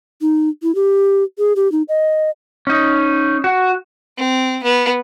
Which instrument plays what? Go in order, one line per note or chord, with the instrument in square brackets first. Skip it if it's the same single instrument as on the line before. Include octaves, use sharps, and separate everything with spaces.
[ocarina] D#4
E4
G4
G#4
G4
D#4
D#5
[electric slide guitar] C#4 D#4
F#4
[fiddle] C4
B3